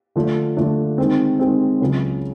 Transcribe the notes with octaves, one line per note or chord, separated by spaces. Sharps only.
D3 F3 A3 D4
D3 F3 A3 D4
D#3 G#3 C4
D#3 G#3 C4
C#2 C#3 F#3